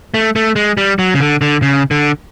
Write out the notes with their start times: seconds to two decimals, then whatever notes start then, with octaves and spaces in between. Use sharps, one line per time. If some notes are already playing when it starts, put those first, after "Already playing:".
0.14 A3
0.36 A3
0.56 G#3
0.77 G3
0.99 F#3
1.14 C#3
1.20 D3
1.41 D3
1.62 C#3
1.91 D3